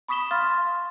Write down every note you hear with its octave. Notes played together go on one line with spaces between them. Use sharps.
B5 C#6 D#6 B6 E7 G7
F5 C6 D#6 F6 A6